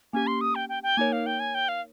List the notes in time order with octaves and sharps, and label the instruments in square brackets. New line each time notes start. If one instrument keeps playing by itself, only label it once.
[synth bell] A#3 C#4 G4 [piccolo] G#5
[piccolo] C6
D#6
G5
G5
G5
[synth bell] A#3 D#4 A#4 C#5 [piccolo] G#5
[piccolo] F5
G5
G#5
G5
F5